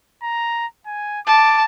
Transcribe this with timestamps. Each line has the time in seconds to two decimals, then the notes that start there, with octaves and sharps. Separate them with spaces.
0.23 A#5
0.86 G#5
1.27 A5 D6